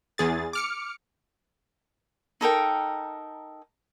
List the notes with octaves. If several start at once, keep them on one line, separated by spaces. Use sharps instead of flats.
E2 G#4 A6
D6 F6 C#7
D#4 A4 A#4 G5